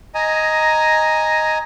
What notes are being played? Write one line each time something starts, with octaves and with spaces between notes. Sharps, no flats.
D#5 G#5 A#5